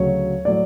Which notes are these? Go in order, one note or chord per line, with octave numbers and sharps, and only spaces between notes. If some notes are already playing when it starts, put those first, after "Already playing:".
Already playing: D2 C#3 F#3 C#5
A2 F#3 A3 D5